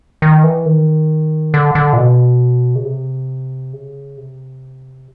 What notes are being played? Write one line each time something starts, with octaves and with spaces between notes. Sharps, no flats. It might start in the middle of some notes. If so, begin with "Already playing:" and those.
D#3
E3
D#3
D3
D3
A#2
B2
C#3
C3
C#3
C3